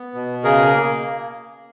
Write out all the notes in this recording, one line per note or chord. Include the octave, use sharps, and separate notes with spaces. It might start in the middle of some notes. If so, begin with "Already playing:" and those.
Already playing: B3
B2
C#3 G#4 A#4
A#3